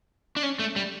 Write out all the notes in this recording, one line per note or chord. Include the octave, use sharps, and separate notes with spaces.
D4
C#4
A3
G3